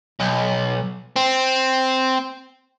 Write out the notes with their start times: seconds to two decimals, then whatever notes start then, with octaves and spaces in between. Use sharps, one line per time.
0.20 B1
1.16 C4